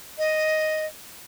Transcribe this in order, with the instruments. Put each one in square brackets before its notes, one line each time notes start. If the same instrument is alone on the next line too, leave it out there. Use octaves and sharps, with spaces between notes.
[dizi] D#5